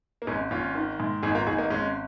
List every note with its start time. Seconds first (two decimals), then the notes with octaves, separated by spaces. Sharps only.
0.22 A#3
0.27 G#1 G#3 C#4
0.51 G#1 C#4 F4
0.75 D#3
1.00 G#2
1.23 G#1 D#4 G#4
1.35 F4 A#4
1.47 G#1 D#4 G#4
1.58 A#3 D#4
1.70 G#1 G#3 C#4